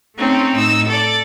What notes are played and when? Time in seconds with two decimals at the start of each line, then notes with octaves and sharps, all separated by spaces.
0.16 A3 C4 C#4 D#4
0.54 A2 D#4 E6
0.88 A4 D5